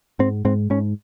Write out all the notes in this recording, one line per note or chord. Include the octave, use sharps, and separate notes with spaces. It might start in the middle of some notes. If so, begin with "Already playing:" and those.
G#2 C4
G#2 C4
G#2 C#4